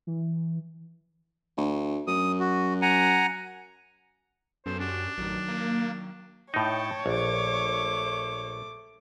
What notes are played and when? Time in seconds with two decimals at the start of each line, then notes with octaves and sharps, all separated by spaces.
0.07 E3
1.57 D2
2.07 F#2 D#6
2.40 F#4
2.82 F#5 G#5 A#5
4.66 F#2 B3 C#4 A4 C5
4.80 C#4 D4 F#4 G4
5.18 A1 D#3 F#3
5.48 A#3
6.54 A2 D#4 C#5 G5 A5
7.06 A#1 A3 D6